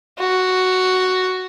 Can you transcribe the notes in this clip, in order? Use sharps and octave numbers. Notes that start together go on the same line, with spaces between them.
F#4